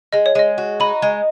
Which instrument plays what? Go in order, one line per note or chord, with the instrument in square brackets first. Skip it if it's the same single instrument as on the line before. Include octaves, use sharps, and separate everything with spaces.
[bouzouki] G#3 [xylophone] D#5
[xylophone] C#5
[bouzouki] G#3 [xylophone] D#5
[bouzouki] F#4
[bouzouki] D#4 [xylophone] B5
[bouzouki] G#3